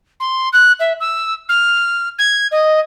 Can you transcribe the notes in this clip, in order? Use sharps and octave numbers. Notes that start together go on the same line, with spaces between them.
C6
F#6
E5
E6
F6
G#6
D#5